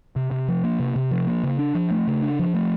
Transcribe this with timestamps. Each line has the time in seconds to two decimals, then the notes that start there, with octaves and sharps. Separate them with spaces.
0.16 C3
0.31 C3
0.48 F3
0.64 A#3
0.80 C3
0.96 C3
1.11 F3
1.27 A#3
1.44 C#3
1.59 D4
1.75 F3
1.91 A3
2.07 C#3
2.22 D4
2.39 F3
2.55 A3